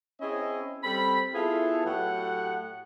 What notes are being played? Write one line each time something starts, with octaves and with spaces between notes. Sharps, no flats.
C4 C#4 E4 G#4 C#5 D#5
G3 C4 A4 B5
B3 E4 F4 G#4 A4
A2 F#3 A3 G4 F#5